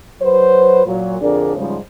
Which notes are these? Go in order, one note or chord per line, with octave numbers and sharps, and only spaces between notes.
F#3 B4 C5
A#2 F#3
F2 D3 D4 G#4 A#4 D5
G#2 C#3 F3 G3 G#3 C5